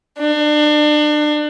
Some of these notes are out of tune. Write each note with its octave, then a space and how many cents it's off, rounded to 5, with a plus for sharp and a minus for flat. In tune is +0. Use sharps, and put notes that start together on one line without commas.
D4 +30